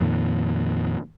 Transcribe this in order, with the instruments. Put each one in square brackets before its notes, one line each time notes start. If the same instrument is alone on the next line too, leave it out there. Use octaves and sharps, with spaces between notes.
[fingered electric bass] F2 A#2 D#3